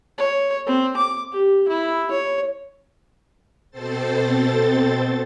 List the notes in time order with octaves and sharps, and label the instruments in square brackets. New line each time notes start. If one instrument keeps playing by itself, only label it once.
[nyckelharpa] C#5
C4
D6
G4
E4
C#5
[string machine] B2 C4 A4 C5 A6